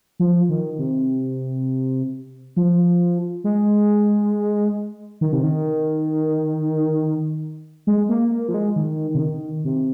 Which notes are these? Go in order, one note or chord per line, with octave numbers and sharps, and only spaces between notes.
F3
D#3
C3
F3
G#3
D#3
C3
D#3
G#3
A#3
A#3
F3
G#3
D#3
C3
D#3
C3